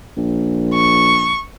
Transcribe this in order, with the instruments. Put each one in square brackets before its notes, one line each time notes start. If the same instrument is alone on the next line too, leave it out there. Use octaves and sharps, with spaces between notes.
[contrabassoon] A#1
[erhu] C#6